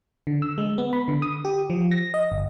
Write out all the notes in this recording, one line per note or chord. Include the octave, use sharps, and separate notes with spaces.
D3
E6
G#3
B3
B5
D3
D#6
G4
F3
A#6
D#5
G1